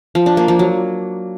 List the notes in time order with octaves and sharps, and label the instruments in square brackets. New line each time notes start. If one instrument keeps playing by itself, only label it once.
[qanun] F3
D4
A#3
F3
F#3